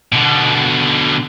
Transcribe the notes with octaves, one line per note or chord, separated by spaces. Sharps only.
B2 D3